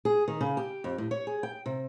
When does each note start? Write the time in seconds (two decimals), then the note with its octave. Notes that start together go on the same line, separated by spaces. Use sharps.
0.05 G#4
0.28 D#3
0.41 C#3
0.57 G4
0.84 F2
0.98 A2
1.11 C#5
1.27 G#4
1.43 G5
1.66 C3